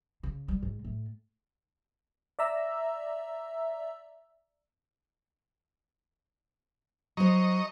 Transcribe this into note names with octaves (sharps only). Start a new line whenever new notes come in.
C#3
G3
G#2
A2
D5 E5 A#5 E6
F#3 C5 D#5 A#5 C#6